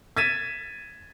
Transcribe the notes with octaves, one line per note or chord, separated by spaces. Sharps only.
G#6 A6 B6 D#7 E7